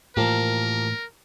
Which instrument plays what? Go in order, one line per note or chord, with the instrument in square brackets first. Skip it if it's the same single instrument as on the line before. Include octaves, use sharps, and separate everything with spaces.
[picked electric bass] A2 E3 [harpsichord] F3 A#3 G4 [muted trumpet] A#4